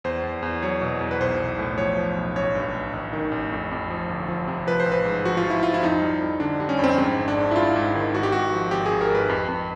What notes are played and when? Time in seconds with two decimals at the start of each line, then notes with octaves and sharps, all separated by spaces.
0.04 E2 C5
0.23 E2
0.43 E2
0.63 F#3 C#5
0.81 B2
1.01 E2
1.11 B4
1.20 B1 C5
1.40 B1
1.59 A2
1.78 F3 C#5
1.97 F3
2.17 B1
2.36 A1 C#5
2.55 G2
2.74 A1
2.93 A1
3.13 D#3
3.32 A1
3.52 F2
3.71 F2
3.90 F3
4.09 G1
4.28 F3
4.48 C3
4.67 F3 B4
4.80 C5
4.86 A1
4.92 B4
5.05 G#2
5.25 F3 F#4
5.37 F4
5.44 F3
5.50 E4
5.63 F3 F4
5.74 E4
5.83 F2 D#4
6.02 G3
6.21 F2
6.40 D3 D4
6.60 G3
6.69 C#4
6.79 F2 C4
6.98 G#2 C4
7.18 G#1
7.28 D4
7.37 G#2
7.51 E4
7.56 G#2 F4
7.76 G#2
7.95 D#3
8.14 G#1 F#4
8.23 G4
8.32 G#1 F#4
8.53 F3
8.71 G#1 G4
8.86 G#4
8.91 G#1
9.01 A#4
9.10 G#1 B4
9.29 F2
9.48 F2